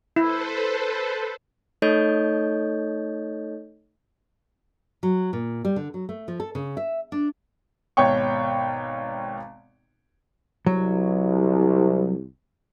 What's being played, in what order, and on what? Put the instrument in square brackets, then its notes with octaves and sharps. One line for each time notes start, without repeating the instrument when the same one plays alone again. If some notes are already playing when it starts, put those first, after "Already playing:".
[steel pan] E4 [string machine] A4 B4 C5
[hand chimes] A3 D#4 A4 C#5 D#5 G6
[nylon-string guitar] F#3
A#2
G3
D3
F#3
A3
F3
A4
C#3
E5
D4
[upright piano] G#1 B2 C#5 G5 C#6
[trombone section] C2 [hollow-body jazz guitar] F#3